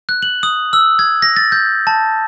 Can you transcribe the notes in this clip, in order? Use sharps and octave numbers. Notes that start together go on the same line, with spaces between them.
F#6
F#7
D#6
E6
G#6
A#6
A6
G6
A5